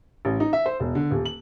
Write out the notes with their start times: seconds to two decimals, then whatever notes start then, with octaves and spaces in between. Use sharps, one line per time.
0.25 A1
0.40 D#4
0.53 E5
0.66 C5
0.80 E1
0.95 D3
1.11 D#1
1.25 F#7